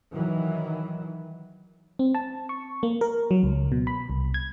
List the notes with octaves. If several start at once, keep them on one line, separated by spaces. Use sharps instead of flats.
D#3 E3 F#3
C4
A5
C#6
A#3
A#4
F#3
C#2
B2
B5
C2
G#6